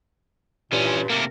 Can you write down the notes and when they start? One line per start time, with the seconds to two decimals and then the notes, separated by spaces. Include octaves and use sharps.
0.72 G2 A#2 E3 C#4
1.10 C3 A3 A#3 A#4